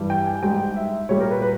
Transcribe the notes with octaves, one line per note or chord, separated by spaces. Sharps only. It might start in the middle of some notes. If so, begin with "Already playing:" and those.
Already playing: G2 E3 G3
G5
G#5
G#2 G3 G5
E5
A#2 G3 C#5
A#4
B4
B4